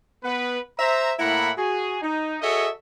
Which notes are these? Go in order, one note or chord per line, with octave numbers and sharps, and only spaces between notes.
B3 B4
C5 E5 A#5
A2 A#3 E4 F#5 A#5 B5
F#4 G#4
D#4
F#4 G#4 A4 C#5 D#5 E5